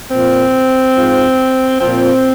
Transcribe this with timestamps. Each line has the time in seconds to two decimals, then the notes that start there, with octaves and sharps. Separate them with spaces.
0.11 A#2 F3 C4
0.95 G#2 F3
1.80 A#2 F3 C4